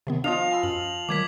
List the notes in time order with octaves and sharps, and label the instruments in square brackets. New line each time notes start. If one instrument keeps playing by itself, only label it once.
[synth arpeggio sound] C3 D#3 B3
[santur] F3 D#5 F5 [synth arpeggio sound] D4 [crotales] F7
[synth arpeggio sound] G#5 B5 E6
[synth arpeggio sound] F#2 [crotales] F#7
[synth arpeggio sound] D#3 F#3 A#4 [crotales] D6 G#6 B6